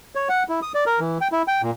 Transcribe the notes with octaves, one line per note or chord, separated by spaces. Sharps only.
C#5
F#5
E4
D#6
D5
A#4
E3
G5
E4
G5
A#2